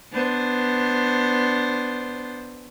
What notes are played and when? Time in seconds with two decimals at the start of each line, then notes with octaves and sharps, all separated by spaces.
0.13 B3 D4 C5